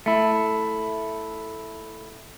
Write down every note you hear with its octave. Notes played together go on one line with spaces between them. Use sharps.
A3 E4